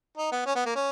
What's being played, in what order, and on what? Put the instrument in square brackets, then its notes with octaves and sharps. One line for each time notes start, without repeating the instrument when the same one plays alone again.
[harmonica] D#4
B3
C#4
B3
A#3
C#4